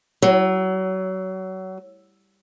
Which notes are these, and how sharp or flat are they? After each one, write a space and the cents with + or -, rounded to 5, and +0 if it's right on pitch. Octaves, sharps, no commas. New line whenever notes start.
F#3 +25